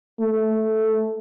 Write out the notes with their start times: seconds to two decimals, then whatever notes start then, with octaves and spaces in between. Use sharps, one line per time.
0.20 A3